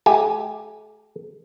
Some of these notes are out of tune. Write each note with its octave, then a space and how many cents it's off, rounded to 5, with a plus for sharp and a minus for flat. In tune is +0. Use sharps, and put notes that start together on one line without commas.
A3 -45 G4 +0 G#5 +0